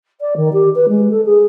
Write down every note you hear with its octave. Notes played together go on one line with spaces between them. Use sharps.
D5
D#3
G4
B4
G#3
A4
G#4